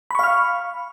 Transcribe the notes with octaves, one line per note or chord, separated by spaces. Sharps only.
F5 B5 C#6 F6